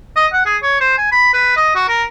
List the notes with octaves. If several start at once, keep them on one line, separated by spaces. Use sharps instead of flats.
D#5
F#5
G#4
C#5
C5
G#5
B5
B4
D#5
F#4
A#4